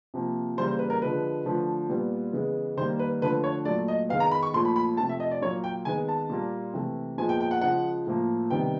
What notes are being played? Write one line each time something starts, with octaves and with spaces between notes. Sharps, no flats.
C3 F3 A#3
C#3 E3 G3 A#3 C5
C5
B4
A#4
D3 F3 G#3 B4
D3 F3 A3
A#2 G3 B3
C#3 E3 G#3 B3
D#3 G3 A#3 C5
B4
D3 F3 A3 B4
C#5
A#2 F#3 A3 D5
D#5
D#3 G#3 B3 F5
A#5
B5
C#6
A#2 F3 A3 C6
B5
B5
C3 F3 A3 A5
E5
D#5
D5
A#2 F#3 A#3 C#5
G5
D#3 G#3 B3 G#5
A5
A#2 G3 A#3
C3 E3 A3
A#2 F3 G#3 B3 G#5
G5
G5
F#5
C#3 F3 G#3 F#5
A2 F3 A#3
C3 D#3 G3 B3 G5